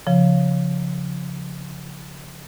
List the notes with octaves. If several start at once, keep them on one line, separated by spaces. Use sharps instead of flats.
C#3 F3